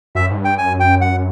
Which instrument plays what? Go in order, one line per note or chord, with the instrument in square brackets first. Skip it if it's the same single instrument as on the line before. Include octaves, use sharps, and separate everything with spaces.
[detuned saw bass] F#2 [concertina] E5
[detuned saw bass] G#2
G2
[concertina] G5
[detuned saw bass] F#2 [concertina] G#5
[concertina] G5
F#5